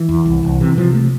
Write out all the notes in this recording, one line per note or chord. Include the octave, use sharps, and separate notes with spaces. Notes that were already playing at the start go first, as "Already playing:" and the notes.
Already playing: E3
E2
C2
C2
C3 E3
C3 F3
A3